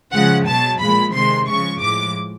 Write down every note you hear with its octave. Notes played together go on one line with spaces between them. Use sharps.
C#3 F3 G#3 F#5
B2 F#3 A5
A#2 F3 G#3 B5
C3 D#3 G#3 C6
C#3 F3 G#3 C#6
A2 F3 G#3 D6